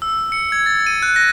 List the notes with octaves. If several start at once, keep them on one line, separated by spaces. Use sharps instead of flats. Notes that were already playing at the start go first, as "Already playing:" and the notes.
E6
C#7
G#6
A6
D#7
F#6
A#6